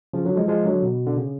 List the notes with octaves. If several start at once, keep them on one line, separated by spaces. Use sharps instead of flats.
C#3 F3
D3 F#3
F3 G#3
F3 G#3
D3 F#3
B2
D3
C#3